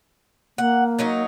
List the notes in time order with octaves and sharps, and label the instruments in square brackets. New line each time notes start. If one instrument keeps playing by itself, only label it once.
[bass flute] A#3 [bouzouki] F#5
[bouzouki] F#3 C#4 D#4